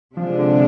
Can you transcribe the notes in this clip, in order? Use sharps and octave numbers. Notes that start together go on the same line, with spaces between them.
C3 F3 G#3 D4
D3